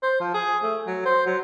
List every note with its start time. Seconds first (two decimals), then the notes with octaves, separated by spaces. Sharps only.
0.03 C5
0.21 F3
0.34 G#4
0.63 A3
0.87 F#3
1.06 C5
1.26 F#3